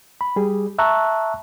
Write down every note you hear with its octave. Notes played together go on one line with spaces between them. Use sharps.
B5
G3 G#4
E5 A5 A#5 C#6 E6 F#6